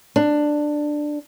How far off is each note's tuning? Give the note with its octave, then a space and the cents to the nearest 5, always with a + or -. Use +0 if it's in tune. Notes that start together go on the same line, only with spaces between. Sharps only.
D4 +10